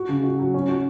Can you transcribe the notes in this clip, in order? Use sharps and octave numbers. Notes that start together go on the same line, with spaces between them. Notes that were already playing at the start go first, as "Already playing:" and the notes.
Already playing: F#4
C#3
F#4
F#3
C#4
F#4